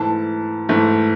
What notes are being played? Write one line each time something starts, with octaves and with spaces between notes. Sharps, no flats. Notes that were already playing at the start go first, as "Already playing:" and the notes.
Already playing: G#2 E3 A3 A5
G#2 E3 A3